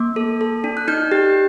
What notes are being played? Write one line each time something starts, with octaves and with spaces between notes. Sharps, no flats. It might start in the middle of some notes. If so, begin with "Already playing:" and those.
Already playing: A#3 D6
A4
A4
D4
F#6
D#4 G6
G4